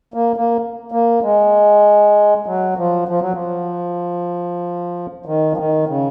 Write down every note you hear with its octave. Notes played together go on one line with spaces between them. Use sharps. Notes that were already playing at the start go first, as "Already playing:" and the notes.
A#3
A#3
A#3
G#3
F#3
F3
F3
F#3
F3
D#3
F3
D#3
C#3